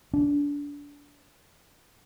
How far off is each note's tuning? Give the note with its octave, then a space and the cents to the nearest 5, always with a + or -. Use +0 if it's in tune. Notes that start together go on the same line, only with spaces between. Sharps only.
D4 -25